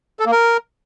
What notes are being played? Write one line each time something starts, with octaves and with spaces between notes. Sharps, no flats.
A4
A#3
A#4